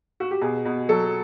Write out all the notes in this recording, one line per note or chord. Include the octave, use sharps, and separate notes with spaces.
F#4
G4
B2 G#4
B2
F#3 A4